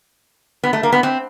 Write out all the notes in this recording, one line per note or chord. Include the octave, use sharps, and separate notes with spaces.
B3
A3
A#3
B3
C4